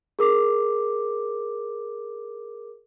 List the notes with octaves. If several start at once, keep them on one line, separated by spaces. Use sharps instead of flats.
G#4 A#4 D6